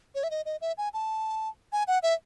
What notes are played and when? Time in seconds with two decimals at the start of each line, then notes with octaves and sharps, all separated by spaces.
0.15 C#5
0.23 E5
0.31 D#5
0.45 D#5
0.61 E5
0.78 G#5
0.94 A5
1.72 G#5
1.87 F#5
2.03 E5